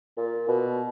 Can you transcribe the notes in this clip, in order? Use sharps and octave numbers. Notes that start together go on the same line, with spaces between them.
A#2
B2